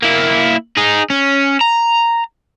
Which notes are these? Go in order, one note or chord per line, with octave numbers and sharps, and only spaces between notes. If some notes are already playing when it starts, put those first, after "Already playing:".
A#3 E4
D#4 G#4
C#4
A#5